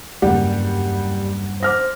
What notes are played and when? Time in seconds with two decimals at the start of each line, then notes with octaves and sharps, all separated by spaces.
0.22 F#1 E2 G2 G3 F#5
1.63 C5 D6 F6 A#6